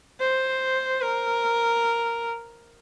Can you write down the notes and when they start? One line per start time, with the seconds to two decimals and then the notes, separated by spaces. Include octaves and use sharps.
0.20 C5
1.01 A#4